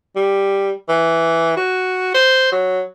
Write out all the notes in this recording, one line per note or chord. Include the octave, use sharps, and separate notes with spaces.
G3
E3
F#4
C5
F#3